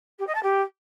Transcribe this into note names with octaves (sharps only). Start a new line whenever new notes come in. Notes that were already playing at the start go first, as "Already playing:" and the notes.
G4
D#5
A5
G4